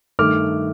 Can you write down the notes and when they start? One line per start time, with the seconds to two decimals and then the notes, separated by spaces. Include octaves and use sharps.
0.19 G2 D#3 A3 D6 F6